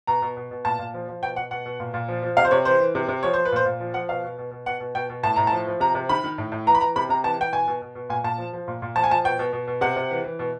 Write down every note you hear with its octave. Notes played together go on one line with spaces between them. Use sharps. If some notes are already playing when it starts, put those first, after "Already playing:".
B2 A#5
B2
B2
B2
A#2 A5
A#2
F3
F3
B2 G5
B2 F#5
B2 F#5
B2
A#2
A#2
F3
F3
C3 F5
C5
C3 C#5
E3 C5
E3
C3
C3
F3 C#5
F3 C5
B4
A#2 C5
A#2
F3
F3 F#5
B2 F5
B2
B2
B2
B2 F#5
B2
B2 G5
B2
A2 A5
A2 A#5
A5
F3
F3
C3 A#5
C3
D#3 B5
D#3
A2
A2
E3 A#5
B5
E3 A#5
C3 B5
C3 A#5
E3 A5
E3 G5
B2 G#5
B2
B2
B2
A#2 G#5
A#2 A5
F3
F3
A#2
A#2
F3 A5
G#5
F3 A5
B2 G5
B2
B2
B2
C3 F#5
C3
E3
E3
B2